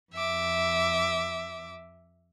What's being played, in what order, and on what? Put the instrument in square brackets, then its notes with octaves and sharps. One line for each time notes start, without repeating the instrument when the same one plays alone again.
[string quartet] F2 E5 D6